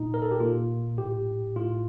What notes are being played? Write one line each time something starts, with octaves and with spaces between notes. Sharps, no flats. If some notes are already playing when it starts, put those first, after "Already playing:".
Already playing: A#2 D#4
A#4
A4
G4
A#2 F4
A2 G4
A2 F4